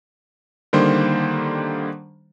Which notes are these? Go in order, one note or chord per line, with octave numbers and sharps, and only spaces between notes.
D3 D#3 G3 A#3 C5